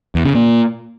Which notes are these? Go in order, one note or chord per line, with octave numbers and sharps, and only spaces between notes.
E2
C#3
A#2